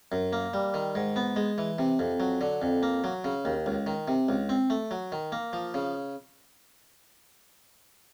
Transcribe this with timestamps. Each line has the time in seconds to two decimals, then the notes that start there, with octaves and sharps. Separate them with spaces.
0.12 F#2
0.33 A#3
0.54 G3
0.74 D#3
0.95 G#2
1.16 B3
1.36 G#3
1.58 E3
1.79 C3
1.99 F2
2.20 F#3
2.41 D3
2.62 F2
2.83 A#3
3.04 F#3
3.24 C#3
3.45 D#2
3.66 C#2
3.87 D#3
4.08 C3
4.29 C#2
4.49 C4
4.70 A3
4.91 F#3
5.12 D#3
5.32 A#3
5.53 F3
5.74 C#3